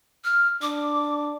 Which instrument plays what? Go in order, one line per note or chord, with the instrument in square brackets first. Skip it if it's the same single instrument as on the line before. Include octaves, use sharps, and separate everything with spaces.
[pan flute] F6
[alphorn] D4 [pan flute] D6